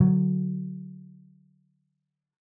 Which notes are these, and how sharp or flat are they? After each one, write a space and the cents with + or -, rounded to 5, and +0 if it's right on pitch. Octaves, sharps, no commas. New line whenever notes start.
D3 +0 F#3 +0